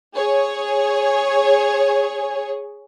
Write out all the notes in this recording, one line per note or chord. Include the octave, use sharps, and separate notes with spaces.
G#4 C#5